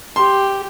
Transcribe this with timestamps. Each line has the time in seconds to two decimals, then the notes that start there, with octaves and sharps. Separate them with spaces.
0.16 G4 C6